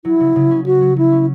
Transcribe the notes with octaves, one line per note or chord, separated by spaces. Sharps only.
F#3 E4
C#3
C#3
C#4
C#4 F#4
F#3
F#3 E4
C#4